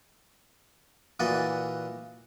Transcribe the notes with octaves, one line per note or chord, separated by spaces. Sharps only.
A#2 E3 F#4 D5 D#5